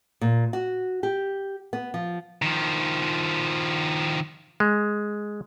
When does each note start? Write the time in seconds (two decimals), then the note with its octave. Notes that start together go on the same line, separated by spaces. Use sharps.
0.21 A#2
0.53 F#4
1.03 G4
1.73 B3
1.94 F3
2.42 D#3 F3
4.60 G#3